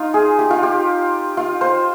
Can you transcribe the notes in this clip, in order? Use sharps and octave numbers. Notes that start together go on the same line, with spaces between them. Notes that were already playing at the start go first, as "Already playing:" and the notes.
Already playing: D#4 F4
G#4
G4
F4
G4
F4
C5